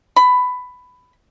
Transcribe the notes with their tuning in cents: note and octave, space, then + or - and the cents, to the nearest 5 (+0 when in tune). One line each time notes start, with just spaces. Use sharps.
B5 +15